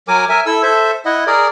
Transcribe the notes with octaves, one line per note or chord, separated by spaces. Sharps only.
F#3 A#4 G#5 D6
A#4 E5 G#5
E4 A4 E6
A4 C5 E5
E4 D#5 F#5
G#4 A#4 D5